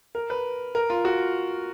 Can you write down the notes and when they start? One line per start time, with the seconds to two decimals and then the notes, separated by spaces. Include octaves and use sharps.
0.15 A#4
0.30 B4
0.75 A#4
0.90 F4
1.05 F#4